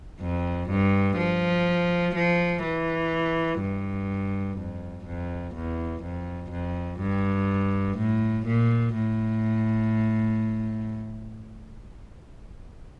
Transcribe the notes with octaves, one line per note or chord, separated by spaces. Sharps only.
F2
G2
F3
F3
E3
G2
F2
F2
E2
F2
F2
G2
A2
A#2
A2